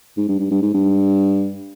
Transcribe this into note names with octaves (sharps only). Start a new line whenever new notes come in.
G#2
G2
G2
G2
G#2
G2